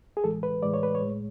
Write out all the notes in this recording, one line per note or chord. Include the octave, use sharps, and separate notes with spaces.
G#4
A2 E3 G#3 A4
B4
A2 E3 G#3 D5
C#5
B4
C#5
A2 G#3